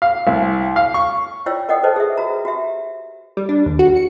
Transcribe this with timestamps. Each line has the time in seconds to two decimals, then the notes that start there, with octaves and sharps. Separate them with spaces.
0.02 F5
0.27 C2
0.76 F5
0.94 C#6
1.46 E4 F4 C#5 D5 G5 E6
1.69 A#4 D5 D#5 F#5 G5 D#6
1.83 A4 B4 C5 D#5 A5
1.96 G#4 E5
2.17 F#4 A#4 A#5
2.45 F#4 G4 E5
3.37 G3
3.49 D4
3.66 D#2
3.79 F#4
3.96 C#7